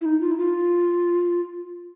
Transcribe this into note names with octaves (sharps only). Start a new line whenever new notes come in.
E4
D#4
F4
E4
F4